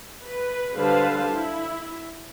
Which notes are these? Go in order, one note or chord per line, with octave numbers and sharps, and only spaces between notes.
B4
D3 G3 B4 C5 F5 A5
E4